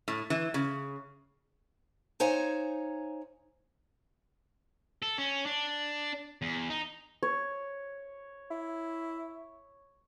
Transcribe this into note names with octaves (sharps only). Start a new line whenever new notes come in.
A2
E3
C#3
D#4 C5 C#5 F5 G#5 A#5
A4
C#4
D4
E2
D#4
C#5
E4